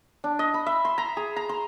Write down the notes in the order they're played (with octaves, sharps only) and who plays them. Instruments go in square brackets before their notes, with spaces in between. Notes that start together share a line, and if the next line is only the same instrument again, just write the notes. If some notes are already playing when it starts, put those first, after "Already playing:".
[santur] D4
D#5
B5
E5
C6
A#5
G#4
A#5
C6